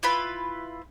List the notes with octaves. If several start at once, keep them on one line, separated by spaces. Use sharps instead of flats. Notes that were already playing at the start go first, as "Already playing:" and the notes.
E4 F4 B4 B5